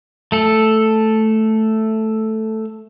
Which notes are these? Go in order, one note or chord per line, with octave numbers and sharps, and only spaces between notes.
A3 A4